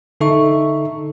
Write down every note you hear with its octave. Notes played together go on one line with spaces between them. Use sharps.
D3 D#4 A4 E5 C#6